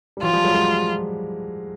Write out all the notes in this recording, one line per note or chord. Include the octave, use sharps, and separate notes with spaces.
G3
E3 F#3 F4
F3 G3
F#3 G#3
F#3 G#3